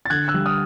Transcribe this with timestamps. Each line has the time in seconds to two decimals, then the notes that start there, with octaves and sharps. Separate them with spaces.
0.05 A6
0.10 D3 F#6 G#6
0.28 E6 F#6
0.34 G3
0.46 D#6 F6